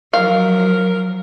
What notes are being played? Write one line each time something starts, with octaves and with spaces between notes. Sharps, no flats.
F3 F#3 A#4 F5